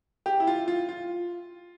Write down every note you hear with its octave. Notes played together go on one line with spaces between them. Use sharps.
G4
E4
F4
F4
F4